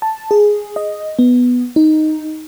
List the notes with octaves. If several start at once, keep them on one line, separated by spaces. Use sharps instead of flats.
A5
G#4
D#5
B3
D#4